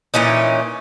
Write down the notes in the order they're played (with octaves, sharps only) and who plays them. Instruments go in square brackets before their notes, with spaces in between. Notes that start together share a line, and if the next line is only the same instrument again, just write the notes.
[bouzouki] A#2 E3 C#4 D#4